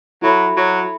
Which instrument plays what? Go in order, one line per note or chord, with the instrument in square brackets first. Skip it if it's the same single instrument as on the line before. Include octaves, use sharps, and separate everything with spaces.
[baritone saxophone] F#3 [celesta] E4 A4 E5 B5
[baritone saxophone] F#3